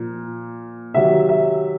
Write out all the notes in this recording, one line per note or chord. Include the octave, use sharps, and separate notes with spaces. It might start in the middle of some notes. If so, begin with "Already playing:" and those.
Already playing: A#2 F3
C3 D#3 F#3 E5
E5